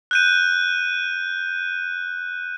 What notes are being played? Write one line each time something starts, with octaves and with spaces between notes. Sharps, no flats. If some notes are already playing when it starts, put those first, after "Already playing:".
F#6 G6 D#7